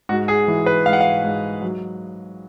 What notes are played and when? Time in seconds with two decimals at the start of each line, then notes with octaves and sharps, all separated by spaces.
0.09 G#2 F#4
0.28 G#4
0.48 E3
0.66 B4
0.86 G#2 F5
0.93 F#5
1.01 F5
1.24 G#2
1.62 F#3